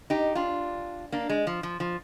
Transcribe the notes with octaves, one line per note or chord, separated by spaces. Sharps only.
D#4 G4
D4 F4
A#3 D4
G#3
F3
F3
F3